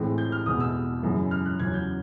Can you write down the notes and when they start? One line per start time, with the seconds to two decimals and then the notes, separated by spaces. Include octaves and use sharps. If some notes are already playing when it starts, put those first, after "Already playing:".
Already playing: A2 E3 G#3 C4
0.18 G6
0.32 F6
0.46 E2 B2 G#3 B3 D#6
0.60 E6
1.03 F#2 C#3 E3 G#3
1.31 F6
1.46 F#6
1.60 E2 C#3 F#3 G#6
1.74 G6